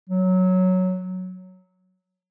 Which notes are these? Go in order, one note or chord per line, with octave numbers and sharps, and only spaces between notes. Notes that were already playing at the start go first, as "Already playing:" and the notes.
F#3